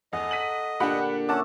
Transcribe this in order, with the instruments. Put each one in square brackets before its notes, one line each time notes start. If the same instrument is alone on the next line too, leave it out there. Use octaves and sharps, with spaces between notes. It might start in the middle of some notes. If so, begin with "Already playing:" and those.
[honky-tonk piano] E2 [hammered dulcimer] A4 F#5 A#5 [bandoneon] D#5
[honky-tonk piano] B6 D#7 F#7
[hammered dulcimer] A#2 D3 [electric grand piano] D4 G4 [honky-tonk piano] F#5 B5
[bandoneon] C#4 F#5 [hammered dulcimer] E5 C#6 [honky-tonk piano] A5 D6